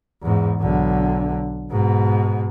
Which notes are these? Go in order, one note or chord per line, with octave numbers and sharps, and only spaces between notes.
E2 G#2
B1 D3
G#2 B2